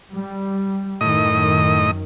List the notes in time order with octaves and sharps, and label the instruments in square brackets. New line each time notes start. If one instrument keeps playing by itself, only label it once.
[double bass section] G3
[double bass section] F#2 D#3 [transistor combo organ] A2 D#5 D#6